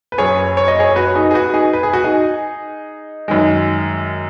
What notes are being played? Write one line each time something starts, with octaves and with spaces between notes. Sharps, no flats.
B4
F#1 F#2 F#3 G#4 C#5
C#5
D#5
G#4 C#5
F#4 B4
D#4 G#4
G#4
F#4 B4
D#4 G#4
B4
G#4
F#4
D#4 G#4
F#2 D#3 G#3